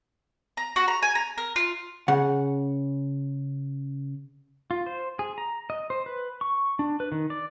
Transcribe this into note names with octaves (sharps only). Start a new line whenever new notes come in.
A#5
F#4
A#5
G#5
A#5
A#4
F4
C#3 F#5
F4
C5
G#4
A#5
D#5
C5
B4
C#6
D4
B4
D#3
D5